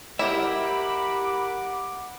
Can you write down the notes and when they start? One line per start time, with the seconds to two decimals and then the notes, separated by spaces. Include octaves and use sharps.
0.19 E4 G4 A#4 E5 F#5 B5 D6